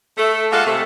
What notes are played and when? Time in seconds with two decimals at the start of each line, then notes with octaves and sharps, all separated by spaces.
0.17 A3
0.51 G#3 A#3 F4 A4 F#5
0.66 C3 A3